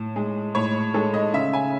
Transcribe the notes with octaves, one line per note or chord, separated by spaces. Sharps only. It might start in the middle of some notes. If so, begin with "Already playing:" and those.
Already playing: A2
G#3
A2 C#5
G#3 A4
D#5
C#3 E5
G#5